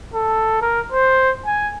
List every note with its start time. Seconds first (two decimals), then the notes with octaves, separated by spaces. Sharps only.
0.14 A4
0.62 A#4
0.92 C5
1.46 G#5